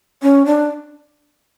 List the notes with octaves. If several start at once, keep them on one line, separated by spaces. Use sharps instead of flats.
C#4
D4